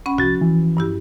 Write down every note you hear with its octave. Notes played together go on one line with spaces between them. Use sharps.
C#4 F#5 B5
C2 F3 F#4 A6
E3
G2 E4 G4